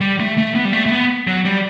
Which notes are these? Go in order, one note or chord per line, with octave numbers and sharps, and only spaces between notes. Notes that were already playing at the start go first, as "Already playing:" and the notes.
G3
A3
A3
B3
G3
A3
A3
B3
F#3
G3